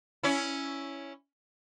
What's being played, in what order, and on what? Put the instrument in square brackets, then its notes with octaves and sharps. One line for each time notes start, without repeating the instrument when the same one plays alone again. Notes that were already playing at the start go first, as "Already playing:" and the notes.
[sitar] C#4 E4